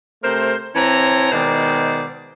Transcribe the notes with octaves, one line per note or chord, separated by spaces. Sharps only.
C3 A3 A#4 C5
E3 C4 C#5 A5 A#5
B2 D#3 G#3 C5 D5